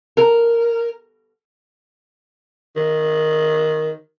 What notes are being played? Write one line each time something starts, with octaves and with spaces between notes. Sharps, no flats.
A#4
D#3